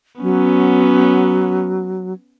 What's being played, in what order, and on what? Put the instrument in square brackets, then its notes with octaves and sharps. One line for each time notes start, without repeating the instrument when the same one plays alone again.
[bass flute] F#3 [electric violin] B3 C#4